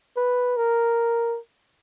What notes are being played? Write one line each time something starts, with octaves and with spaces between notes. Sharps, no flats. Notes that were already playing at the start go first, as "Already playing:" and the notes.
B4
A#4